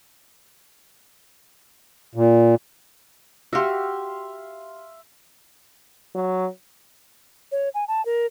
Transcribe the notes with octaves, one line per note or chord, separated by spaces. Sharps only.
A#2
F#4 G4 E5 F5 C6
F#3
C#5
G#5
A5
A#4